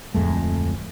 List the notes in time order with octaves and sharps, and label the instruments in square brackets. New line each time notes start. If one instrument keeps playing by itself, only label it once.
[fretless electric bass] D1 F2 G#3 A3